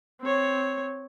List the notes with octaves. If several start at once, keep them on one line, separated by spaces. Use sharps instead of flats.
C4 C#5